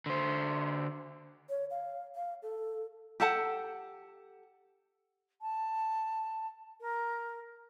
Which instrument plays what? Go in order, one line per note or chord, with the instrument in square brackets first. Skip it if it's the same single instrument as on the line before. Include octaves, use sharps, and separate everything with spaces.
[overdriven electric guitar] D3 C5
[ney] C#5
F5
F5
A4
[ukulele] G4 A4 F#5 A5
[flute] A5
A#4